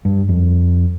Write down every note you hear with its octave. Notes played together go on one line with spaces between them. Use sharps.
G2
F2